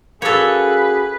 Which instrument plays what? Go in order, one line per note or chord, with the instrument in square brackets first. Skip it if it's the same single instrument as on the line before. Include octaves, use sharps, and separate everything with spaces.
[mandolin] A#3 E6 [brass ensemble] C#4 F#4 G#4 [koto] A4 C#5 [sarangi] B4